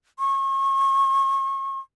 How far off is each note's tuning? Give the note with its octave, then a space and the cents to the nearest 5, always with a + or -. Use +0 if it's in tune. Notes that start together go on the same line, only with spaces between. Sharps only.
C#6 -35